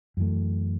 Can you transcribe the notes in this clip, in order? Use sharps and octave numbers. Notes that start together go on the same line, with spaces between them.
F#2 E3 A3